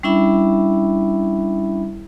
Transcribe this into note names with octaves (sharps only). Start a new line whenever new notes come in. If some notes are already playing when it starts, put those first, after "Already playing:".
G3 C#4 D4 E4 E5 B5